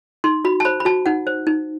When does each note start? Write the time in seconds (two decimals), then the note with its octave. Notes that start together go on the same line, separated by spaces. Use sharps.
0.24 D#4 C6
0.45 F#4 B5
0.60 A5
0.65 C5 B5
0.80 B5
0.85 F#4 A5
1.06 D#4 F#5
1.27 C5
1.47 D#4